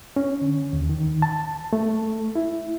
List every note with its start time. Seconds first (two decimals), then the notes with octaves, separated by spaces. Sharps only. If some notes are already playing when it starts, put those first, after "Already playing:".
0.16 C#4
0.42 D3
0.73 D#2
0.89 D#3
1.22 A5
1.73 A3
2.35 E4